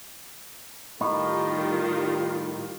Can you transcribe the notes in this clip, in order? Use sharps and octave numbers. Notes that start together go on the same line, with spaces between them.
A2 D#3 G3 D#4 F4